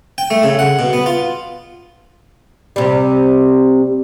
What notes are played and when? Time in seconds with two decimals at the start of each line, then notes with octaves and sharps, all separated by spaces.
0.18 G5
0.31 A3
0.43 C#3
0.59 F#5
0.79 B2
0.93 B3
1.06 F4
2.76 C3 G3